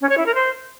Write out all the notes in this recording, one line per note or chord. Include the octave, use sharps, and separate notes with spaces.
C#4
C#5
E4
A#4
C5